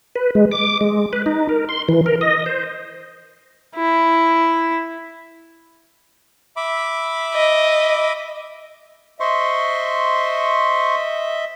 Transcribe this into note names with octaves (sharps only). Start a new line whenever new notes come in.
B4
G#3
D6
G#3
B4
D#4
A#4
C6
E3
A#4
D#5
C5
E4
E5 B5 D6
D#5
C5 D#5 E5 C6 C#6